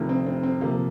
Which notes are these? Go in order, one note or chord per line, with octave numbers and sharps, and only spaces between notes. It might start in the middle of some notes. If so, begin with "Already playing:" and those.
Already playing: F1 F2 D#3
C4
C4
C4
C3 F3 A#3